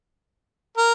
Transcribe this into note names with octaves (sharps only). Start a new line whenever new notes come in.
A#4